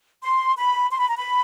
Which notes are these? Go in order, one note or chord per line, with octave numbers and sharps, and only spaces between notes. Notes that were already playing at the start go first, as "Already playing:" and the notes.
C6
B5
C6
B5
A#5
B5